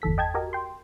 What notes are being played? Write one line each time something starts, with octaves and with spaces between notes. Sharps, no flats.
G1 E2 A4 B6
D#5 G5 A5 G#6
F#4 G4 A#4 D#5
G5 C6